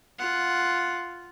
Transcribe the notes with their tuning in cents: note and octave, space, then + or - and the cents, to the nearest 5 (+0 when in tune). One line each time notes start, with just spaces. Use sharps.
F4 +0 F#5 +0